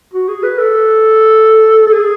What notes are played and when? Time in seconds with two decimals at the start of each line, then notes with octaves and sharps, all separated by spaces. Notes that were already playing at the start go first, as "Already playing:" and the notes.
0.13 F#4
0.28 G#4
0.43 B4
0.58 A4
1.87 A4
1.92 G#4